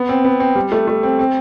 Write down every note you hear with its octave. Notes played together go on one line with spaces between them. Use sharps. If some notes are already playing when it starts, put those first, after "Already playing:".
Already playing: B3
C4
B3
C4
G3
A3
A3
C4
C4